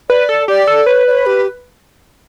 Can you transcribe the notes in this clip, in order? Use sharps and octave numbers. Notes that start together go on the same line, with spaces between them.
B4 D5
A4
G4 D5
A4
B4 C#5
D5
C#5
G4